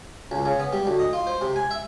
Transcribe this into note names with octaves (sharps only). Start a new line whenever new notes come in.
C#2
C#3
B3
G3
D2
D#5
F4
C5
C3
G#5
E5